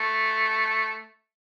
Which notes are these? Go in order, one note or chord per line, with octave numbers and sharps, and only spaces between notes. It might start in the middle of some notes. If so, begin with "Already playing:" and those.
Already playing: A3